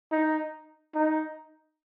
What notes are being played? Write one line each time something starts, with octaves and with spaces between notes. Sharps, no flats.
D#4
D#4